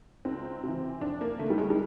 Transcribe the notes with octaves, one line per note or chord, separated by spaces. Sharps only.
C#2 C4
C3 E3
F2 D4
A#3
D3 A3
G3
G#3
G3